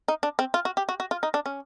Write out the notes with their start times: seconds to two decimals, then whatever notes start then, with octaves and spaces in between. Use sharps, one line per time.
0.08 D#4
0.23 D4
0.39 C4
0.54 F4
0.65 F#4
0.77 G4
0.89 F#4
1.00 F#4
1.11 F4
1.23 D#4
1.34 D4
1.46 C#4